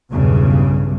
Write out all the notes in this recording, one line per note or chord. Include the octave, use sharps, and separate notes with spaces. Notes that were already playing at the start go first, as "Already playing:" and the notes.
B1 E2 G2 C#3